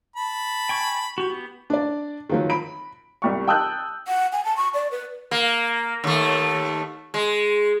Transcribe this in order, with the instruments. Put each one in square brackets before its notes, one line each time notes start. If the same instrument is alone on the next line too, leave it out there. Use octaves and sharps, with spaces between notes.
[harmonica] A5 B5
[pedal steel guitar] G5 G#5 C#6
F#4 G4
B3 G4
[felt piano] D4 D5
D#3 F3 F#3
B5 D7
[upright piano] C2 G3 C#6
G5 A5 D#6 E6 F#6 G6
[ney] F#5
G#5
A5
C#6
D5
B4
[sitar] A#3
D#2 A3
G#3